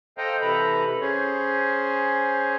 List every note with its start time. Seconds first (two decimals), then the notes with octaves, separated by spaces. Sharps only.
0.18 A4 C5 D#5 F5 G5 A#5
0.41 C3 E3 A4 B4 A#5 B5
1.01 C#4 G#4 C5 C#5